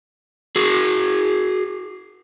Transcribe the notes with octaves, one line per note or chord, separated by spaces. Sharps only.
F#4 G#4